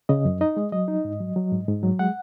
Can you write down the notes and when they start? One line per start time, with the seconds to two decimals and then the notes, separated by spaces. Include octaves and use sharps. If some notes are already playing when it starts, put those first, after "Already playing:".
0.09 C#3 D#5
0.25 F#2
0.41 D#4 D#5
0.57 G#3
0.72 F#3 D#5
0.88 D#4
1.05 G#2
1.20 F#3
1.36 F#3
1.52 G#2
1.68 G#2
1.83 F#3
1.99 G#3 F#5